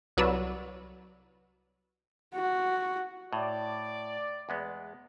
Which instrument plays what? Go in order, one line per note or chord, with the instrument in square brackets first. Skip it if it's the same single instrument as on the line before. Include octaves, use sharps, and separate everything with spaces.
[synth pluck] C2 F#3 B4 D5 E6
[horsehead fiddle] F#4
[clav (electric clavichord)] A2 [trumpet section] D5
[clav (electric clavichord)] E2 G#3 B3